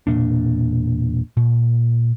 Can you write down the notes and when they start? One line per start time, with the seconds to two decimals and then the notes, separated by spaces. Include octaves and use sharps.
0.07 E1 A#1 A#2 D4
1.37 A#2